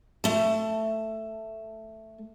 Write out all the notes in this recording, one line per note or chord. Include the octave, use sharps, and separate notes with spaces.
A3 A5